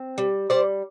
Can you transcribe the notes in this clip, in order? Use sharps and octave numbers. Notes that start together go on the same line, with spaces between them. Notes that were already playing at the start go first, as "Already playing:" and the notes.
Already playing: C4
G3
G3 C5 D5